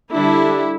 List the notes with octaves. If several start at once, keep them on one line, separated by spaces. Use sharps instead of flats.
D3 G3 D4 E4